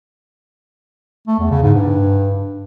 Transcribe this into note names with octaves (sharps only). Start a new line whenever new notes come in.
A3
E2
C#3
G#2
G2